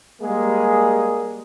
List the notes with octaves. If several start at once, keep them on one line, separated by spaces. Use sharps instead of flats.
G3 G#3 A#3 G#4